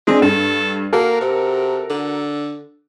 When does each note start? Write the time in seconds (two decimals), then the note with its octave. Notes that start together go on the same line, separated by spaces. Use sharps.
0.07 G#3 C4 D4 G#4
0.22 G2 A4
0.93 A#3 F#4 A4 A#4
1.20 C3
1.90 D3